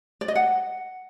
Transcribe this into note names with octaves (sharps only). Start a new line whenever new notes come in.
D5
D#5
F#5